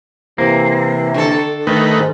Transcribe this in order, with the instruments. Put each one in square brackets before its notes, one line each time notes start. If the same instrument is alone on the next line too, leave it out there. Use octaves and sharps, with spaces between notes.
[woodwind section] C3 E3 [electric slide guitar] A#3
[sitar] D3 A4
[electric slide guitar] D#3 [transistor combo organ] A3 D#4 B4
[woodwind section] G#2